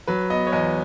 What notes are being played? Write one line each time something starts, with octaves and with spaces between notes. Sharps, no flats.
F#3 B4
B3 D#5
C#5
E2 D#5